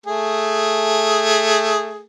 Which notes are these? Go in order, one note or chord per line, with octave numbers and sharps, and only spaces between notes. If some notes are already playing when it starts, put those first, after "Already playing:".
A3 G#4